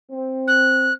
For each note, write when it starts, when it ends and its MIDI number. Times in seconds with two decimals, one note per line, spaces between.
0.11 0.90 60
0.48 0.93 90